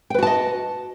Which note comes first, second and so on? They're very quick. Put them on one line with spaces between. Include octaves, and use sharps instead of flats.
G5 B4 F#4 A5 D#5